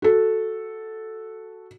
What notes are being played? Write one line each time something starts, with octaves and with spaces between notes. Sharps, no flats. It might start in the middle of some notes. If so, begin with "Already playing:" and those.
F#4 A4